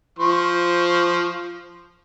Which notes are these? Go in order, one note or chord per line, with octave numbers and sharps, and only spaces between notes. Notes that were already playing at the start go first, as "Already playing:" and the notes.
F3 C5 C#6